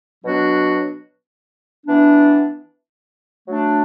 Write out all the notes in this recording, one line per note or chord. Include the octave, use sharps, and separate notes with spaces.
B2 F#3 B3 D4 F#4
E3 B3 D4
F#3 A3 D4